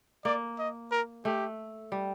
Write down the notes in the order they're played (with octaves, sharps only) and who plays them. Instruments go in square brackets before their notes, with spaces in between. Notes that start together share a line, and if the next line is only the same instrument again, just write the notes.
[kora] A#3 [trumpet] D5
[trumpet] D#5
A#4
[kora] A3 [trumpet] G4
[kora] G3